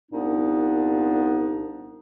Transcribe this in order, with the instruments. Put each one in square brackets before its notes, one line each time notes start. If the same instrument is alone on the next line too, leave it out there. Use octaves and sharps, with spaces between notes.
[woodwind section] C2 A#2 B3 D4 D#4